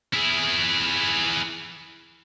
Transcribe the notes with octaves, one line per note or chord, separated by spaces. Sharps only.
E4 G#4